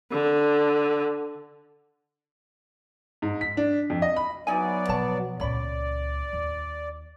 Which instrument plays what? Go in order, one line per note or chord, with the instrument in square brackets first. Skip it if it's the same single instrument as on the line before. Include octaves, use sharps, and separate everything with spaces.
[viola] D3
[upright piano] G#2
B6
D4
F2
D#5
B5
[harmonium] F#3 B3 D5 [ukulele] D#4 E4 G#5
[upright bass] B2 F3 [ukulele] C#5 A5
[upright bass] C#2 A#2 [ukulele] C#5 B5 [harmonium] D5
[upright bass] D#2